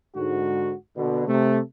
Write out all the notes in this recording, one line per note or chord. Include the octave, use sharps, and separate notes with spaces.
G#2 D3 F#4
B2 D3
C3 A3